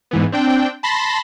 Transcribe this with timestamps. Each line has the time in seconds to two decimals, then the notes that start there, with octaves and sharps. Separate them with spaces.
0.11 G#2 E3 B3
0.32 C4 D4 G5
0.83 A5 B5 C6 A#6